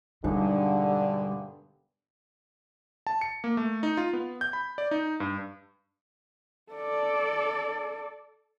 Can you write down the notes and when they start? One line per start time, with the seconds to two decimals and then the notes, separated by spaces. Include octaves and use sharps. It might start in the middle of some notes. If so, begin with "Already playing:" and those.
0.24 E1 G2 D3 G3 D#4
3.07 A5
3.21 C#7
3.44 A#3
3.57 A3
3.83 D#4
3.97 F4
4.13 B3
4.41 G6
4.53 B5
4.78 D5
4.91 D#4
5.20 G2
6.72 A4 D5